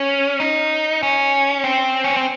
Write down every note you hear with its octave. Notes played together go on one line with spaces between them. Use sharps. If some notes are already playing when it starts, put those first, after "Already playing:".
Already playing: C#4
D#4
C#4
C4
C#4
C4